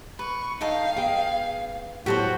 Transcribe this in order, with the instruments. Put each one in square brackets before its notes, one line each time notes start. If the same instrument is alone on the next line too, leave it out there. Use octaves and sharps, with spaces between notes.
[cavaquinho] B4 [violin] C#6
[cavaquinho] D#4 A4 G5 [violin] F5
[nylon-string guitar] B3 G5 [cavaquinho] G#4
[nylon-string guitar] A2 F#3 B3 [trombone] F#4 [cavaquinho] G4 A4 C5